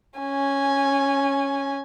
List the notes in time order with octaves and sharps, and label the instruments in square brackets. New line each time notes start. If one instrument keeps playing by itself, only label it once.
[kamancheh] C#4 G#5